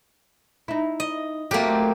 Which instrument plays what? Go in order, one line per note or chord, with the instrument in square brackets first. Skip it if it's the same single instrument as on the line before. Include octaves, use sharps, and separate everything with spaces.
[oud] D#4 E4
[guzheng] D#5
[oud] F#3 A3 C4 [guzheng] A#3 G4